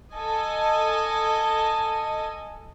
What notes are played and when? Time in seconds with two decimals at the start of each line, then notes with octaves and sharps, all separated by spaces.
0.16 A4 D#5 G#5